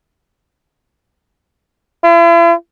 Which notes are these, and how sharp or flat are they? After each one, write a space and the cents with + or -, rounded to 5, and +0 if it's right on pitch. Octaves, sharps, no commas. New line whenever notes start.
E4 +45